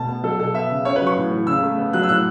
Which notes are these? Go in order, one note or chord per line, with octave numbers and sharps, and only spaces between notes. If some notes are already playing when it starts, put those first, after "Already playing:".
Already playing: B2 A3 A5
B3
F#3 A4
B2 A4
B3 E5
C#3
C#4 C#5
B4
F#3
C#6
A2
E3
C#3 E6
A3
B3
F#3 F#6
E6
A2 F#6